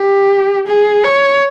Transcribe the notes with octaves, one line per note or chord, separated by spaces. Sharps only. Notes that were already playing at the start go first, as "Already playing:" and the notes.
Already playing: G4
G#4
C#5